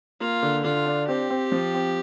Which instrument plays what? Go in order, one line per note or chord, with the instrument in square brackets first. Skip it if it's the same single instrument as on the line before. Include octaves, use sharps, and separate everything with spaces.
[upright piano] A#3 [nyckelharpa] F4
[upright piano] D3
[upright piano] D3 [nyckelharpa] F4
[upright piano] D4
[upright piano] C4 [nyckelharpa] G4
[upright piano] C4
F3
C4